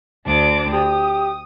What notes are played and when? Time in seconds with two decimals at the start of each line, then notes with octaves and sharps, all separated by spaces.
0.24 D2 D4 D6
0.73 G4 D#6